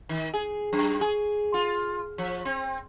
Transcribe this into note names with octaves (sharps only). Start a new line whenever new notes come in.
D#3
G#4
F#2
G#4
F4
F3
C4